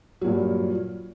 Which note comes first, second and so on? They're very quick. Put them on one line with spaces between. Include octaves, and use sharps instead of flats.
F#3 A#2 G2